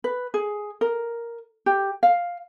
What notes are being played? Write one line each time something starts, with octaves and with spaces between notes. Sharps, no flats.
B4
G#4
A#4
G4
F5